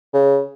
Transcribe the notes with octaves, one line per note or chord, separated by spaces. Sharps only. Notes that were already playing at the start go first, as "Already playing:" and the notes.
C#3